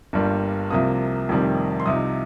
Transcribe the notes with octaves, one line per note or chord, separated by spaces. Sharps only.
G1 G2 G3 A#3
C2 C3 F3 A#3 D#6
F1 F2 C3 D#3 G3
C6
C2 C3 F3 D#4 D#6